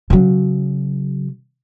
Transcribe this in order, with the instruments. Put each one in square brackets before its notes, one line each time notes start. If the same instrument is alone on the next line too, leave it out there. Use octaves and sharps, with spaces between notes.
[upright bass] C#3 F#3